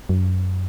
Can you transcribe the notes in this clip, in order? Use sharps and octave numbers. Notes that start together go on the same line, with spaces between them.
F#2